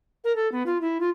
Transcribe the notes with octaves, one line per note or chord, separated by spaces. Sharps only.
A#4
A4
B3
F4
E4
F4